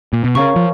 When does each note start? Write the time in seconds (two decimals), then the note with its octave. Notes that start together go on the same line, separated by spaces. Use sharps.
0.13 A#2
0.24 B2
0.35 C#3 A#4 C#5 F5 A#5 C#6
0.56 F3